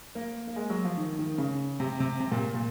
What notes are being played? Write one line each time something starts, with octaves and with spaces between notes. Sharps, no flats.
A#3
A#3
G#3
F#3
F3
D#3
D#3
C#3
C3
C3
C3
A#2
A#2